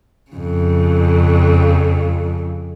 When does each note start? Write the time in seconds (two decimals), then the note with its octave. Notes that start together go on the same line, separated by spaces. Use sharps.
0.31 F2 C#3